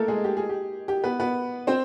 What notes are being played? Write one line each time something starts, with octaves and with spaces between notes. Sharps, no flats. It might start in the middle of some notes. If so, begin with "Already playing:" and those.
Already playing: A3 A#3 A4 A#4
G#3 G#4
G4
G#4
G4
G4
B3 B4
B3 B4
C4 C5